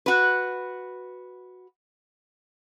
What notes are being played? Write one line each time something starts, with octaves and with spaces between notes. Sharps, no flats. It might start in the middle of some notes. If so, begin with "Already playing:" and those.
F#4 B4